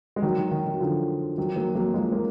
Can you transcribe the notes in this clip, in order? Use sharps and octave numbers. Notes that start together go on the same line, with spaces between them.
G#3
D#3 F#3
D#3
D#3
D#3
F#3
D3 F3
D#3 F#3
F#3 A#3
F#3 A#3
F3 G#3
A#3